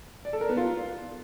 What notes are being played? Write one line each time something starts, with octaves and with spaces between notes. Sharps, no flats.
D5
A4
A#4
B3
F4